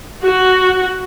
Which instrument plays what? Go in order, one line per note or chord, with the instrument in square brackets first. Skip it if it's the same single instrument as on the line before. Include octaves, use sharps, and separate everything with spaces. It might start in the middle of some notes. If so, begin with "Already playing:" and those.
[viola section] F#4